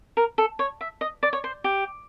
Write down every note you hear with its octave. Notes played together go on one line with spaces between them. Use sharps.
A#4
A4
C#5
E5
D#5
D5
C#5
C5
G4